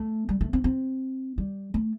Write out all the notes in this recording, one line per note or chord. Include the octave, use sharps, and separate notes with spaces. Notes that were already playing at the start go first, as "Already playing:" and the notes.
Already playing: A3
G3
A3
C4
C4
G3
A3